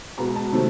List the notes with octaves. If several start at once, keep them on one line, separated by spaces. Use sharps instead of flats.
B2 G#3 B3 A#5
A5
C3 D#3 F#3 A3